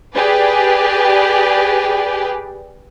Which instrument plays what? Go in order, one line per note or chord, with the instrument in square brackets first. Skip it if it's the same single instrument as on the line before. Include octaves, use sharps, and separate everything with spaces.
[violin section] G4 G#4 B4 D5